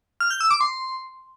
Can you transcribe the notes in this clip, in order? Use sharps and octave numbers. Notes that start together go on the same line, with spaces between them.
F6
G6
E6
D6
C6